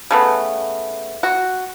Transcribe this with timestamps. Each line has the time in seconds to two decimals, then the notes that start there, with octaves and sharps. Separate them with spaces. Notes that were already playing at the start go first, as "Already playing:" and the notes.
0.11 C#3 A3 B3
1.23 F#4